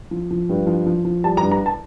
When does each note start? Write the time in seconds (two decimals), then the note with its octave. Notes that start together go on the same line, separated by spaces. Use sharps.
0.11 F3
0.31 F3
0.49 G2
0.67 F3
0.86 F3
1.05 F3
1.24 G3 A5
1.37 A#5
1.43 G2
1.51 A#5
1.66 A5